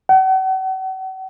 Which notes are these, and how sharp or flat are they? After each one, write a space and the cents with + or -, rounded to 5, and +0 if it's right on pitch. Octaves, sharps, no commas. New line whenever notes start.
F#5 +40